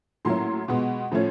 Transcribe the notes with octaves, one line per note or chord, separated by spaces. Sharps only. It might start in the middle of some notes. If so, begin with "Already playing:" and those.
A2 F#3 A#3 C#4 E4 C6
B2 G#3 B3
A2 F3 A3 C#4